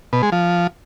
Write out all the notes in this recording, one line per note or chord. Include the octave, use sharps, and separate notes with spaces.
B2
G#3
F3